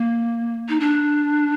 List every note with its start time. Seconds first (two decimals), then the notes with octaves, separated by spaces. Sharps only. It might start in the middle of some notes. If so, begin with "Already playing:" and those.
Already playing: A#3
0.69 D#4
0.80 D4